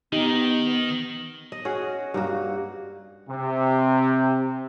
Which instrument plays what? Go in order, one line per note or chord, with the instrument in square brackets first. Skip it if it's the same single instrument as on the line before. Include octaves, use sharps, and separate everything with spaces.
[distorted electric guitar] D#3 [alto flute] B3 [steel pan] D#4 G4
[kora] D#5
C#4 F#4 G#4
G2 A#3 F#4
[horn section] C3